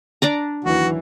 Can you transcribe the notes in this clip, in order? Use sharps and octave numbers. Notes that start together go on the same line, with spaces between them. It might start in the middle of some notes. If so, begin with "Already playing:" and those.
D4 D5 A#5
D#2 E3 F#3 F#4